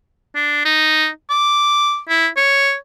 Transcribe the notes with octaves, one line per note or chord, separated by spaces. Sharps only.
D4
D#4
D6
E4
C#5